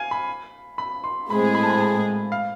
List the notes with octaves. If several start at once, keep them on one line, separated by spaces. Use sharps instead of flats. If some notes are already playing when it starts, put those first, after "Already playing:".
Already playing: F5 G#5
B5
B5
C6
A2 G#3 C4 G#4 B5
B5
A5
B5
A5
F5